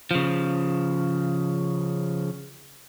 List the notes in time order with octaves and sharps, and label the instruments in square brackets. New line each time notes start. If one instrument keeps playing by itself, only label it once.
[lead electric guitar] C#3 F3